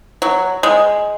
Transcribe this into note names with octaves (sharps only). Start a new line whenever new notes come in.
F#3
G#3